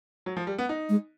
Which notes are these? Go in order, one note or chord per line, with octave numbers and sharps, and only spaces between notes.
F#3
F3
G3
B3
D#4
G#3